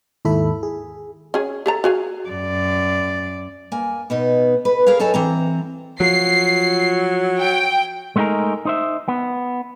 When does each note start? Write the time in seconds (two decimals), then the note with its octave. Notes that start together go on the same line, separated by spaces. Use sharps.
0.25 D#2 G#2 E4 A4 E5 B5
0.63 G#4
1.34 C#4 G#4
1.66 G4 A4 A#5
1.84 F#4 G#4 F5
2.29 F#2 D5
3.72 A#3 G#5
4.10 B2 B3 D#4
4.65 B4
4.86 G#4 A#4 C#5 F5
4.99 F#2 D#4 A4 C#5 G#5 A5
5.14 E3 C4 A#5
6.00 F3 F#3 C7
7.40 G5
8.16 G#3 A3 B3 D#4 G#4 A#4
8.65 D#4 C5 E5
9.08 B3